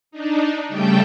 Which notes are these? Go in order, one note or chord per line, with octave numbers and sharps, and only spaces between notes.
D4 D#4
C#3 G3 A3 G5 A5 G6